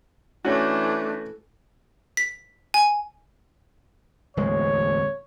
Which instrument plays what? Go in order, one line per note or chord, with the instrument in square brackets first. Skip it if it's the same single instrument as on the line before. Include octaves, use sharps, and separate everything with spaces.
[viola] E3 [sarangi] A3 [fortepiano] C#4 F#4 [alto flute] D4
[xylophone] B6
G#5
[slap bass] D1 E2 G#3 [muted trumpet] C#5